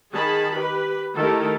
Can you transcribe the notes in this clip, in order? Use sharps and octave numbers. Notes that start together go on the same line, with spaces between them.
D#3 G#4 A5 B5
G4 B4
D#3 A3 E4 G4 A4 A#4